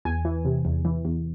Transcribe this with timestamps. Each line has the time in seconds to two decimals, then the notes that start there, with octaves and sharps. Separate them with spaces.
0.05 E2 G#5
0.25 E3
0.45 C3
0.65 E2
0.85 E3
1.05 E2